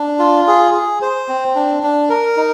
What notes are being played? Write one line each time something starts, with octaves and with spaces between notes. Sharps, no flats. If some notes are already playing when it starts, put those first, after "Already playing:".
Already playing: D4
F4
G#4
G#4
C5
C4
D4
D4
A#4
D#4